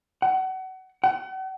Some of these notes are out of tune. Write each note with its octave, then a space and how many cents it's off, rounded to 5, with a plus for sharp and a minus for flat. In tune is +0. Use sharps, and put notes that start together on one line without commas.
F#5 +30
F#5 +40